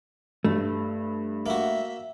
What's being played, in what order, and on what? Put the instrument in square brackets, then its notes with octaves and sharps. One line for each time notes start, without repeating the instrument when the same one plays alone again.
[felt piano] G2 [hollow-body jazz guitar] A3
[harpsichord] A#3 F#4 [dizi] E5